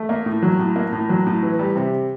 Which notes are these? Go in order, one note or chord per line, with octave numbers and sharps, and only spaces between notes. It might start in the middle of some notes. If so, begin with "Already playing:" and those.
Already playing: A3
A#3
A2
F#3
A2
A#3
A2
F#3
A2
E3
G3
C3